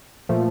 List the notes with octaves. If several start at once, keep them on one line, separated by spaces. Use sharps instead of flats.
A#2 F3 A3